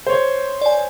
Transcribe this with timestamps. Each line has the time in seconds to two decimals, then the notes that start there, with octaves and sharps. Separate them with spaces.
0.07 C5 C#5
0.61 D5 G#5